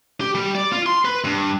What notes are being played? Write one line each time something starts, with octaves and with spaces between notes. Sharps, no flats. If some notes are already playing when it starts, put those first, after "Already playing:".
G4
G3
D5
F4
C6
B4
G2